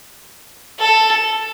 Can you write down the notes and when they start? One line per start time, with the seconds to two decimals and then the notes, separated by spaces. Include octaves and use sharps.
0.79 A4